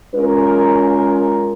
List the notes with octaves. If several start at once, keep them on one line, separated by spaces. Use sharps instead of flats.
G#3 C#4 F4 A#4